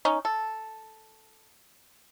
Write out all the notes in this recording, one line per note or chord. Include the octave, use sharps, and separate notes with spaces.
C#4 D#4
A4